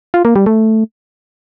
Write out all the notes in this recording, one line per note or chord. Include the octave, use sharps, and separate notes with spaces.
F4
A#3
G3
A3